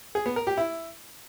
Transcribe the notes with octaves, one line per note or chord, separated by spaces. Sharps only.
G#4
B3
A#4
G4
E4